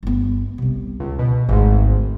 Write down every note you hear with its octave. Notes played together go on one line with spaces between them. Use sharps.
G1 B3
C2 C3
C#2
B2
G#1 D2 G#2